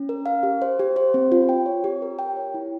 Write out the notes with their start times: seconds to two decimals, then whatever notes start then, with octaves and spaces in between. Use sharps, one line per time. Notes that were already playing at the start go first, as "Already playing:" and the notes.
Already playing: C#4
0.09 A#4
0.26 F5
0.43 G4
0.62 C5
0.79 G4
0.96 C5
1.14 C4
1.32 F4
1.49 G5
1.66 C#5
1.84 G4
2.02 A#4
2.19 G5
2.37 C#5
2.54 E4